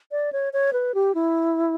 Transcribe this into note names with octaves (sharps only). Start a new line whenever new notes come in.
D5
C#5
C#5
B4
G4
E4